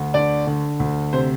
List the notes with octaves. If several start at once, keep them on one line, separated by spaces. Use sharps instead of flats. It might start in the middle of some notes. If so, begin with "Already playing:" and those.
Already playing: D2
D3 D5
D3
D2
C3 C5